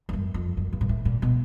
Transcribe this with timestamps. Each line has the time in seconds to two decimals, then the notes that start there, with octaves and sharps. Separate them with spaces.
0.09 G2
0.13 F#2
0.34 F2
0.57 F#2
0.73 G2
0.81 A#2
0.89 A2
1.05 A#2
1.22 B2